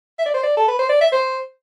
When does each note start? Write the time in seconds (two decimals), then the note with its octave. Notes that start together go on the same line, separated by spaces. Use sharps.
0.19 E5
0.26 D5
0.34 C5
0.43 D5
0.57 A4
0.68 B4
0.79 C5
0.89 D5
1.01 E5
1.12 C5